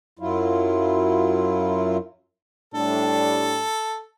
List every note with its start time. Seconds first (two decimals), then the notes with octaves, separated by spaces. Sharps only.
0.19 F#2 F#3 E4 F4
2.74 A2 G3 D4 A4